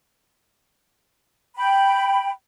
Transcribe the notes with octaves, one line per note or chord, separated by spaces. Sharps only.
G5 B5